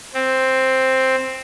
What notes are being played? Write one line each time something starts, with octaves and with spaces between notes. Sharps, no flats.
C4